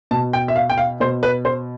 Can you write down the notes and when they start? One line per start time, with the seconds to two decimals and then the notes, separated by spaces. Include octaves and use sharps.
0.11 B2 A5
0.33 G5
0.48 E5
0.56 F5
0.70 G5
0.78 F5
1.00 B2 C5
1.23 B4
1.45 C5